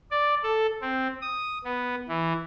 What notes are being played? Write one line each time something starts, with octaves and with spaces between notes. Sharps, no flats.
D5
A4
C4
D#6
B3
E3